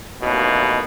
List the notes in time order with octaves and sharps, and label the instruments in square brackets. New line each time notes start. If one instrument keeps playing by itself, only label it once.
[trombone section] A1 D#2 B2